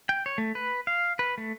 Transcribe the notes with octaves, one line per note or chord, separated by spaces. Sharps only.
G5
C#5
A3
B4
F5
B4
A3